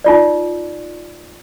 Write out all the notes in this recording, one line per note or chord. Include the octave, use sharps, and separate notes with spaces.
D#4 F4 D5